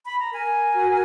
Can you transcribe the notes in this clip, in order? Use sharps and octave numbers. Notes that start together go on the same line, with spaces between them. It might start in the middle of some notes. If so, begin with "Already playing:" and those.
B5
A#5
A#4 G#5
F#4